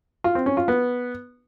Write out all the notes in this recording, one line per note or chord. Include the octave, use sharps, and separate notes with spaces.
F4
C4
C#4
F4
B3